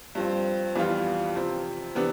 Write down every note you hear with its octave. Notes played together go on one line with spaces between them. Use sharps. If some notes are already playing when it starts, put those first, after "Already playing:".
G2 F3 C4
F2 E3 G3 B3 F4
C3 F3 C4
C3 E3 B3 D4